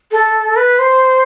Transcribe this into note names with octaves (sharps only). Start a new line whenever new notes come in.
A4
B4
C5